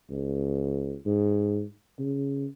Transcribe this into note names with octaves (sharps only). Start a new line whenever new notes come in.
C#2
G#2
C#3